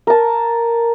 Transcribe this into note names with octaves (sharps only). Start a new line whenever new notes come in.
A#4 A5